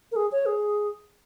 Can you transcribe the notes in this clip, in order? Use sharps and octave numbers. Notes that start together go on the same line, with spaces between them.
A#4
G#4
C#5
G#4